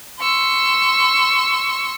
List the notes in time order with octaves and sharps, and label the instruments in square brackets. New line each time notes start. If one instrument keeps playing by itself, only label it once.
[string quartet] C6 C#6 E6